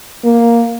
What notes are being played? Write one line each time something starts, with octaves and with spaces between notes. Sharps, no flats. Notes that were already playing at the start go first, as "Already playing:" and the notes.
A#3